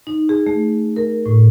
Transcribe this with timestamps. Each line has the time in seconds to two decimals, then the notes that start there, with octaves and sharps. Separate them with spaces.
0.07 D#4
0.29 G#4
0.47 A3
0.96 A#4
1.26 A2